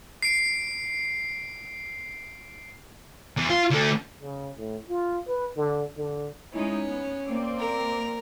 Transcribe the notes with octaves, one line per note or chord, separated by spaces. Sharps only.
C7 D7
E2
F4
D3 A3
C#3
A2
F4
B4
D3
D3
G#3 C#4 D#4 E4
B3
A#3 C4 D5
A#4